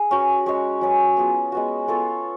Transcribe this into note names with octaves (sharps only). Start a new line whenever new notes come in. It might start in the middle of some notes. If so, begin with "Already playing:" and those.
Already playing: G#4
C#4 F#4 B4
G#3 C#4 G#4 C#5
F#3 C#4 G#4 B4
B3 F4 G#4
G#3 B3 F#4
B3 F4 A4 C#5